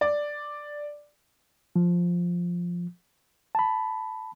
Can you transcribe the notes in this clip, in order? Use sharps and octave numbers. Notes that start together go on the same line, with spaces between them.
D5
F3
A5 B5